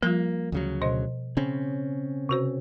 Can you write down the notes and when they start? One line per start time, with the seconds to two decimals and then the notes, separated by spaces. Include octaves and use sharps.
0.02 F3 G3 A#3 F4
0.52 D2 C#3 F#3
0.82 B2 C5 D#5
1.37 C#3 C4 C#4
2.29 C3 F#4 C5